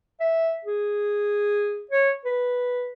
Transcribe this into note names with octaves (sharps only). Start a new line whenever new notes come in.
E5
G#4
C#5
B4